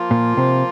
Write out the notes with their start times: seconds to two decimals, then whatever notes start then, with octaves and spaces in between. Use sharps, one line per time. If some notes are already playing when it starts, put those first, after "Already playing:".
Already playing: F3 A#3 F4
0.11 A#2
0.37 C3